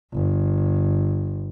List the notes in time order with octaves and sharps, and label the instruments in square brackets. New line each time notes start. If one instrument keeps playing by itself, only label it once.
[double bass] G1